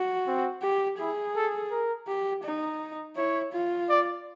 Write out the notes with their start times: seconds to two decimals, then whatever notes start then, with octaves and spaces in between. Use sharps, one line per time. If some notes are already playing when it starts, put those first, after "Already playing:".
Already playing: F#4
0.27 C4
0.63 G4
0.99 E4 G#4
1.36 A4
1.71 A#4
2.08 G4
2.44 D#4
3.16 E4 C#5
3.52 F4
3.89 D5